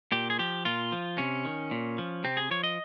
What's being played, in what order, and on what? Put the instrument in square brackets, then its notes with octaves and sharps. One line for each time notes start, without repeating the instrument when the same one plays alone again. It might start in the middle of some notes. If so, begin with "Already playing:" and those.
[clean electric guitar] A#2 G4
G#4
F3 G4
A#2 F4
F3
C3 C#4
D#3
A#2
F3
C3 C4
G#4
F3 C#5
D#5